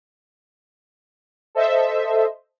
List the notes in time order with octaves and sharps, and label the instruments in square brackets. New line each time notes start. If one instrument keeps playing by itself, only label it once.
[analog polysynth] A4 C5 D#5 E5